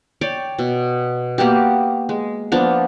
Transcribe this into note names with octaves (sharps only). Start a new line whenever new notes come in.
C#5 D5 G5
B2
A#3 B3 F#4 G4
G#3
F3 A#3 B3 D4